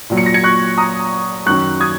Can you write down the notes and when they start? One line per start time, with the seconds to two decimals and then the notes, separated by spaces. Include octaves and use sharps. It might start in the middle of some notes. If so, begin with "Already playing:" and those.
0.10 A#2 F#3
0.17 C#7
0.26 A#6
0.34 G#6 C#7
0.44 C#6 F#6
0.78 A#5 D#6
1.46 F#2 D#3 F#3 C#6 F#6
1.80 D#6 G#6